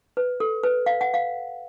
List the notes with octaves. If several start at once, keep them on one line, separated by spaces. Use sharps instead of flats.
B4
A4
B4
F5
F#5
F5